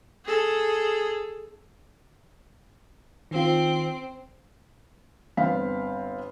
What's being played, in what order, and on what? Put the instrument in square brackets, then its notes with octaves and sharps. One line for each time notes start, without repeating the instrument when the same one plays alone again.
[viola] G#4 A4
[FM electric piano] D#3 F4 [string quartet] C4
[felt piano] G1 B3 C4 F5 B6